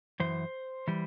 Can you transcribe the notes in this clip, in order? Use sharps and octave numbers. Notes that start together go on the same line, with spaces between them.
F#2 E3 C5
E3 G3